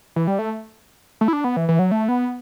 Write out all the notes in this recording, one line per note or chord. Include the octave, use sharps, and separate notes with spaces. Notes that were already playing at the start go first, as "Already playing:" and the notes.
E3
G3
A3
A3
E4
D4
B3
E3
E3
F#3
A3
B3